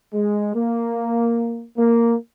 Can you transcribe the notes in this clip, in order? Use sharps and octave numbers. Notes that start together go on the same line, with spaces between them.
G#3
A#3
A#3